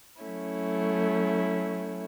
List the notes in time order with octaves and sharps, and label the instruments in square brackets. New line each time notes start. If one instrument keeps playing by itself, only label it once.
[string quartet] F#3 A3 C#4 E4